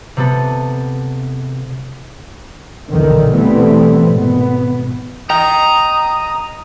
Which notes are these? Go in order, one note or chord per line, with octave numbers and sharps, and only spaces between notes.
C3 B3 A4
B1 E2 A#2 D3 D#3
B2 E3 G3 A3 B3 C4
G#1 B2 B3
D#5 G5 A#5 D#6